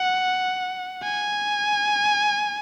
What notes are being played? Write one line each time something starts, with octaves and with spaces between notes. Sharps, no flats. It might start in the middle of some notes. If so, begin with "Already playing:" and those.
Already playing: F#5
G#5